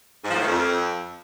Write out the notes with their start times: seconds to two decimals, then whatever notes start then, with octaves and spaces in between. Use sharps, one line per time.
0.24 G#2
0.30 F3
0.36 A2
0.42 D#3
0.48 F2